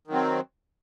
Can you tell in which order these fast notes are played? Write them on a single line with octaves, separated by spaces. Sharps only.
D#3 F#3 C4